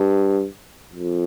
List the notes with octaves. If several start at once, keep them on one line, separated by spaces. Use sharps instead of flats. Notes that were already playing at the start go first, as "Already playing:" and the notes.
Already playing: G2
F2